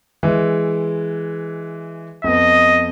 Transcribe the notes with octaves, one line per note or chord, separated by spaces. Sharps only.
E3 G#3
F2 B3 D#5